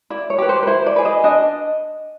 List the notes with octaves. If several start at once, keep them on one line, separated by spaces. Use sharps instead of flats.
E4 D5
C#5
G4 B4
C5
B4
E4 C5
D5
G#4 B4
D#5
D4 D#5